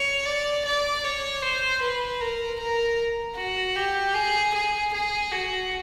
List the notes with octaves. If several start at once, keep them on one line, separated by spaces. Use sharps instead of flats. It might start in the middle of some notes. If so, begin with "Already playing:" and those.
Already playing: C#5
D5
D5
C#5
C5
B4
A#4
A#4
F#4
G4
G#4
G#4
G#4
F#4